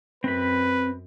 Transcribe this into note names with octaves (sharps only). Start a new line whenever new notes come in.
F#2 C4 B4 B5